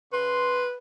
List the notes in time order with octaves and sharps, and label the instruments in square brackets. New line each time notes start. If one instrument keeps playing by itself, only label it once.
[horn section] C#3 C6 [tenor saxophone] B4